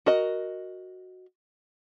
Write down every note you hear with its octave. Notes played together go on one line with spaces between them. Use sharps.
F#4 A#4 D#5